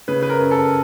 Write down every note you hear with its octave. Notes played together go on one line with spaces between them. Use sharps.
C#3 B4
B4
A#4
F#2
A4